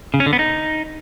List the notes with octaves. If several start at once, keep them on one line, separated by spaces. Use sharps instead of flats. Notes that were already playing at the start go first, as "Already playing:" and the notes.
C#3
C#4
D3
B3
D#4